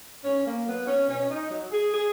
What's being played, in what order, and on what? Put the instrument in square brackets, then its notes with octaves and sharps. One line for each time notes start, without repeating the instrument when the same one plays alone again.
[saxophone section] G#2 C#4
A#3
F#3 B3
C#4
B2 C#4
D#4
F#3
G#4
G#4